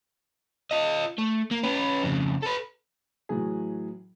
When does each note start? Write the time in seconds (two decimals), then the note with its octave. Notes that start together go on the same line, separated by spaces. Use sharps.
0.71 F4 D#5
1.18 A3
1.51 A#3
1.63 C#4 B4
2.03 F2 C#3
2.42 A4 B4
3.29 A2 E3 F#3 G#4